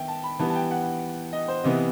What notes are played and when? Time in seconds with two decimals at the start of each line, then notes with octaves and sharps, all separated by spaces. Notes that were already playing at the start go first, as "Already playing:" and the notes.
Already playing: D#3 B3 E5 G5
0.08 A5
0.24 B5
0.40 E3 G3 B3 A5
0.50 A5
0.55 G5
0.71 F#5
1.33 D#5
1.48 C5
1.64 C3 E3 B3 D#5